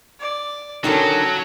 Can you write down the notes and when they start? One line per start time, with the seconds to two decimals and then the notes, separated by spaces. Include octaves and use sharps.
0.20 D5
0.84 D3 D#3 F#3 C#4 D#4 A4